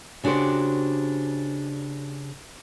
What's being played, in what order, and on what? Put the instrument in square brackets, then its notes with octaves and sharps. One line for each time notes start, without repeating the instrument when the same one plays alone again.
[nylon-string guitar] C#3 D4 F#4 G4 C5